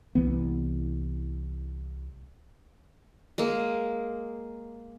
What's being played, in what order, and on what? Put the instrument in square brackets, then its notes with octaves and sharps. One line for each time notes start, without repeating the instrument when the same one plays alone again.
[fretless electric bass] C2 E3 B3
[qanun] G#3 A#3